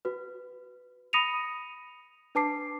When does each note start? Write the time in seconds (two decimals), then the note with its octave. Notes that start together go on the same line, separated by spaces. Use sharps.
0.05 F#4 B4
1.13 B5 D#6 A#6 C#7 D#7 F7
2.35 D4 B4 A5 D6 C7